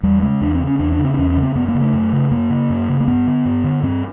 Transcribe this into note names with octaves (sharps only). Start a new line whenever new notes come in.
E2 G3
C#3 G#3
E2 D4
C4
C#3
C#4
E2 D4
D4
C#3
C4
D4
E2 C#4
C#4
C#3
C4
F#2 B3
A#3
C#3
A3
F#2
C#3
F#2 A#3
C#3
F#2
C#3
A#3
G2 B3
D3
G2
D3
G2 C4